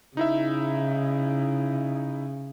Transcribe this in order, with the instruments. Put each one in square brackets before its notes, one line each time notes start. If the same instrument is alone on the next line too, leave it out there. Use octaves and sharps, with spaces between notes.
[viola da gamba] C#3 [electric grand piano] D#4 E4 E5